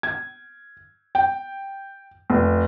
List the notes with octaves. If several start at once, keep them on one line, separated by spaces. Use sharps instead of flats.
G#6
G5
F1